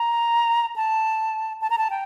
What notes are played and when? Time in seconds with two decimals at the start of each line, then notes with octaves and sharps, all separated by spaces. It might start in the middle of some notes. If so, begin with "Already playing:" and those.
Already playing: A#5
0.76 A5
1.61 A5
1.70 A#5
1.78 A5
1.90 G5